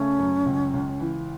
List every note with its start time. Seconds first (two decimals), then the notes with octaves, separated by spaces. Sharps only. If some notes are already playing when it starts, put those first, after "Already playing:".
Already playing: C#3 A3 C#4
0.19 F#2
0.46 C#2
0.73 C#2
1.00 E3